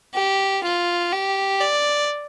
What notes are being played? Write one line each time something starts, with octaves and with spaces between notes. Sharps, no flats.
G4
F4
G4
D5